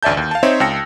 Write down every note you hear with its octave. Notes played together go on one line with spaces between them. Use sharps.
A1 D2 D5 E5 A5 G6
D#2
F5 A5
C4 D#4 C5 C#5 E5
C#2 G5 A5 E6 A#6 C#7